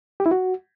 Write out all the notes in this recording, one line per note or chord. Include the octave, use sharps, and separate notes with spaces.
G4
E4
F#4